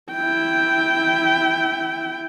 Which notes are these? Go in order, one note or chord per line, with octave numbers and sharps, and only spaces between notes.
E4 G5